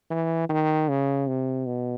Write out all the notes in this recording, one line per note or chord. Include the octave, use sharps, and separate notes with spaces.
E3
D#3
C#3
C3
B2